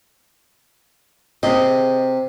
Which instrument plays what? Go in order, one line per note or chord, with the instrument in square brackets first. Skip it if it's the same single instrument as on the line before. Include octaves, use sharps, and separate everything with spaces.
[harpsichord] C3 [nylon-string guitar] G#4 D#5